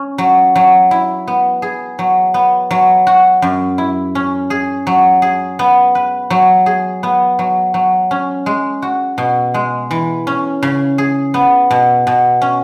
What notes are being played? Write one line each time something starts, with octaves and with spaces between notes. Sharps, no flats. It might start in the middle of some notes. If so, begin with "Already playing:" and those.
Already playing: C#4
F#3
F#3
E4
B3
G#4
F#3
B3
F#3
F#4
F#2
E4
C#4
G#4
F#3
G#4
B3
B4
F#3
G#4
B3
F#3
F#3
C#4
G#3
F#4
B2
G#3
E3
C#4
C#3
G#4
B3
B2
B2
C#4